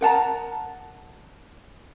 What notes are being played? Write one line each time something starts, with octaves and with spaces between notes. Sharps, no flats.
A#4 F#5 A5 A#5